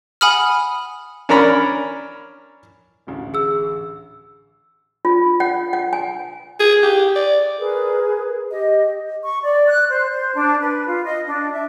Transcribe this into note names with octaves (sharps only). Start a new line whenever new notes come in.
F#5 G#5 B5 D#6 F6
C#4 D4 A#4 A#5 B5
A1 D2
G#4 E6
F4
F#5
F#5
G#5
G#4
G4
D5
G#4 A#4 B4
G4 D#5
C#6
D5
F#6
C5
C5
D4
B4
F4
D#5
D4
E5